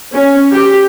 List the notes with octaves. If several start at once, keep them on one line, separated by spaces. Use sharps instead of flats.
C#4
G4